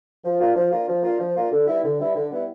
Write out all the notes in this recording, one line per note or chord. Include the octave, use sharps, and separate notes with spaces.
F3
A#3 D4 F4
F3
A#3 D4 F4
F3
A#3 D4 F4
F3
A#3 D4 F4
D3
G3 B3 E4
D3
G3 B3 E4
D3
G3 B3 E4